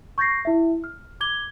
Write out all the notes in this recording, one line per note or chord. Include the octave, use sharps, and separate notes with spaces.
C#6 G6 A6 A#6 C7
E4 E5
F6
D6 G#6 G7